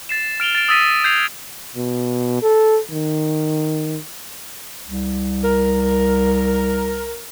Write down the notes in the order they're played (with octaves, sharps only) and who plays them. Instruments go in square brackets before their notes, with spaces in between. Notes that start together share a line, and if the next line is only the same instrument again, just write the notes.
[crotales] A6 C7 E7
F6 D7 F7 G7
A6 D7
D#6 E6 A6 B6 D#7
G6 G#6 C7 F7
[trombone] B2
A4
D#3
[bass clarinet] C2
[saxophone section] A#4